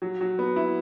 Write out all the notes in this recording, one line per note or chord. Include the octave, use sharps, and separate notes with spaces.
F#3
F#3
B3
E4